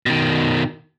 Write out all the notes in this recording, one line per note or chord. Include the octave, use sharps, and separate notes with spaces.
B2 D#3